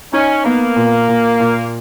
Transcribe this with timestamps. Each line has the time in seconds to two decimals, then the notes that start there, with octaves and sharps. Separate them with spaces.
0.13 C#4 D#4
0.45 A#3 B3
0.76 A#2
1.08 A#2
1.40 A#2